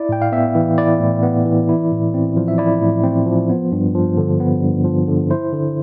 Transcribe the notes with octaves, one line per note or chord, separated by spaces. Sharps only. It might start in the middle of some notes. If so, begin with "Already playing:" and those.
Already playing: E4 D5
A2 G5
F5
B3 E5
E3
E4 D5
A2
B3
E3
E4
A2
C4
F3
E5
E4 D5
A2
C4 C5
F3
B3
G2
F3
D3
B3
G2
F3
D3
E4 C5
D3